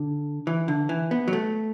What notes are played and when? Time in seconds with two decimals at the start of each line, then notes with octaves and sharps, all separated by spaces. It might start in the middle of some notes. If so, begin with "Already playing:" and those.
Already playing: D3
0.47 E3
0.68 D3
0.89 E3
1.11 B3
1.28 F#3
1.33 A3